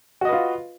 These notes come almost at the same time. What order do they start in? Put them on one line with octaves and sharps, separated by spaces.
F#4 D#5 B4 F4